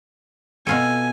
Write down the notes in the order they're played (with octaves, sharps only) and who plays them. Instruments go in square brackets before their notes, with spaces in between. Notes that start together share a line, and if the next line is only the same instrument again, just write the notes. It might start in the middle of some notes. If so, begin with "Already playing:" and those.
[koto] B2 F4 A4 [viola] G#5